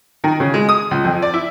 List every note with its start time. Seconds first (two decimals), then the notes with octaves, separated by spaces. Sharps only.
0.24 D#3
0.40 C#3
0.54 G#3
0.69 D#6
0.91 C#2
1.04 F2
1.22 D5
1.34 E4